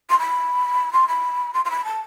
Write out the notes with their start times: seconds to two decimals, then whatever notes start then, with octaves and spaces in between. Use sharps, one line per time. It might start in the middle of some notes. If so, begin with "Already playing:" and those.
0.10 C6
0.19 B5
0.93 C6
1.08 B5
1.54 C6
1.65 C6
1.70 B5
1.85 A5